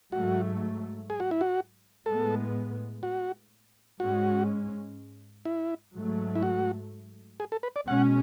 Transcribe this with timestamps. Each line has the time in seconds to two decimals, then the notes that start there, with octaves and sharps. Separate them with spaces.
0.12 G#2 F#3 A3 F#4
1.10 G#4
1.20 F#4
1.31 E4
1.41 F#4
2.06 A2 G#3 B3 A4
3.03 F#4
4.00 G#2 G#3 C#4 F#4
5.45 E4
5.94 G#2 F#3 A3
6.35 E4
6.42 F#4
7.40 G#4
7.52 A4
7.63 B4
7.76 D5
7.88 B2 G#3 C#4 F#5